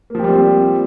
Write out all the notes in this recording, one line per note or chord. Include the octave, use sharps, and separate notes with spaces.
F3 G3 A#3 C4 G4